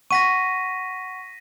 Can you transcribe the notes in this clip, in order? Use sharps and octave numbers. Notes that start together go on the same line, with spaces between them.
F#5 C#6 A#6 B6 D#7